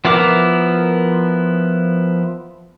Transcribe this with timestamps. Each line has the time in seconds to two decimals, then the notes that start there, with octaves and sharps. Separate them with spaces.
0.05 F3 B3 E4 A#4 D6